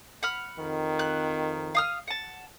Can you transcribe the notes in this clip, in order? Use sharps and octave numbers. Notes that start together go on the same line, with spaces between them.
F#5 B5 F6
F2 D#3
F#6
F5 D#6 F6
F#5 A5